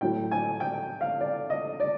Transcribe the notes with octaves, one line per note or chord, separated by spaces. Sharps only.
A2 F#3 A3 G5
G#5
G5
F5
D5
D#5
D5